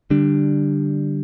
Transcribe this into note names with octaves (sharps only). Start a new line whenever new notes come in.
D3 G3 D4